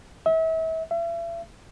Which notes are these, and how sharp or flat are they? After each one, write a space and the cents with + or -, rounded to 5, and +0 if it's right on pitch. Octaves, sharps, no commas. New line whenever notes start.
E5 -35
E5 +40